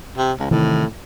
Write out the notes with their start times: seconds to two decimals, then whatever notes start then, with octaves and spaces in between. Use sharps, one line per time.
0.18 C3
0.39 C#2
0.51 A2 C3 D#3 E3